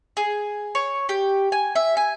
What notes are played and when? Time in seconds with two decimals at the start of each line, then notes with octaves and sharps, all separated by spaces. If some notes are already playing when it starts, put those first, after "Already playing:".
0.17 G#4
0.75 C#5
1.09 G4
1.52 G#5
1.76 E5
1.97 G#5